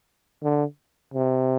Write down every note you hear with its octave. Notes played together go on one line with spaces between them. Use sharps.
D3
C3